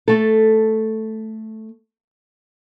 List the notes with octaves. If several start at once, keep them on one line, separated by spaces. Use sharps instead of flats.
A3 A4